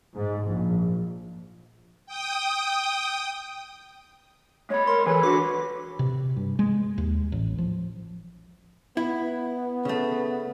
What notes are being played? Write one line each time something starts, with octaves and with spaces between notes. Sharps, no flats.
G#2
A#1
G5 D#6
G#3 C#5 B5
A#4 C6
E3 G#4 A4 B4 C#5
D3 F#4 D6
C3
G2
G#3
D#2
A1
F3
B3 E4
C#3 A3